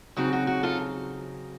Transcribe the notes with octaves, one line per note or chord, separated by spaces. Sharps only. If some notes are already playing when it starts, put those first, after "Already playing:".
C#3 F#3 C4 D#4 F#4
F#4
F#4
F4 A4